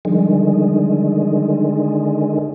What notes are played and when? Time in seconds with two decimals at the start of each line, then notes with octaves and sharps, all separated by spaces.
0.05 D3 D#3 F3 G3 G#3